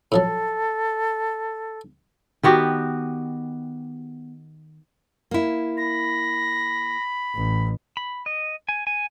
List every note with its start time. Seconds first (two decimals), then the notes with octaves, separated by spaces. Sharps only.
0.12 A2 F3 F#3 A4
2.43 D#3 B3 F#4 G4
5.31 A#3 E4
5.77 B5 A#6
7.35 A1
7.97 B5
8.26 D#5
8.69 G#5
8.87 G#5